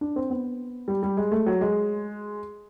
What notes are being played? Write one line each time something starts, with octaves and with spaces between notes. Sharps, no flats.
D4
C4
B3
G3
G3
G#3
A3
F#3
G#3